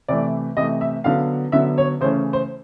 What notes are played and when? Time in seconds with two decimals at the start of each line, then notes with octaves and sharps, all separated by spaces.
0.08 C3 E3 A3 D5
0.57 C3 E3 A3 D#5
0.81 E5
1.04 D3 F#3 B3 F5
1.52 D3 F#3 B3 E5
1.78 C#5
2.01 C#3 E3 A3 C#4 C5
2.33 C5